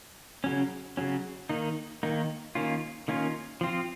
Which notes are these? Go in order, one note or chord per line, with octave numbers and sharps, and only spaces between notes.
C#3 F#3 C#4
C#3 F#3 C#4
D#3 A#3 D#4
D#3 A#3 D#4
D#3 A#3 C#4 F4
D#3 A#3 C#4 F4
F3 C4 F4